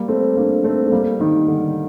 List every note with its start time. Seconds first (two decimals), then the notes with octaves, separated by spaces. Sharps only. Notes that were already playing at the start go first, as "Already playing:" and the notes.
Already playing: G3 A#3
0.08 A3 C4
0.37 A#3 D4
0.64 A3 C4
0.86 A3
0.92 G3 A#3
1.20 D#3 G3
1.48 D3